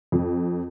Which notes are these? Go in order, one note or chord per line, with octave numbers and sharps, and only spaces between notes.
F2